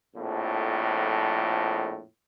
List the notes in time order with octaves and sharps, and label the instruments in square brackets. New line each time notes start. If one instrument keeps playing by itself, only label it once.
[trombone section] A#1 F2 A2